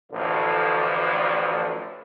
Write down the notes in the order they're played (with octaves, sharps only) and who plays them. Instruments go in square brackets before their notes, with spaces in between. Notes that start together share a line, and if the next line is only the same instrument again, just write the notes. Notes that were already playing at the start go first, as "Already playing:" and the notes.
[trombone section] A1 D2 A2 D3 F3